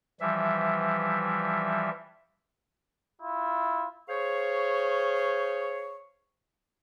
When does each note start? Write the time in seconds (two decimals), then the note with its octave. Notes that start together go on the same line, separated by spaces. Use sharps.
0.21 E3 F3 G3 E5
3.21 E4 F4
4.08 G#4 C5 C#5 F5 C#6